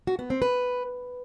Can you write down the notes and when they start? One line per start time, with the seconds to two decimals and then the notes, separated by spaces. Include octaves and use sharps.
0.07 F#4
0.19 B3
0.30 C4
0.42 B4